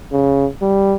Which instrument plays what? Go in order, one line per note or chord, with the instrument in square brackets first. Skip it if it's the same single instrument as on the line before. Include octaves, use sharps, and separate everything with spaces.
[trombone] C#3
G3